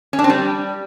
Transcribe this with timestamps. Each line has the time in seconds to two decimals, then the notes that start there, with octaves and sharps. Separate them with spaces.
0.13 C#4
0.19 D4
0.24 C4
0.30 G3